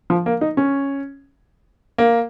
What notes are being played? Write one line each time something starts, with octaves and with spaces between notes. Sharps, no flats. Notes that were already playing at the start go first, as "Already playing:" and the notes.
F3
A#3
D#4
C#4
A#3